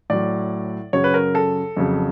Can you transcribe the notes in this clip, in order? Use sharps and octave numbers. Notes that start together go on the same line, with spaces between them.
A2 F#3 D5
F#2 C#3 F#3 C#5
B4
A#4
A4
F2 C#3 F#3